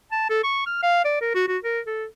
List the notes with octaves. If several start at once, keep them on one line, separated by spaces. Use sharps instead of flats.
A5
A4
C#6
F6
F5
D5
A#4
F#4
F#4
A#4
A4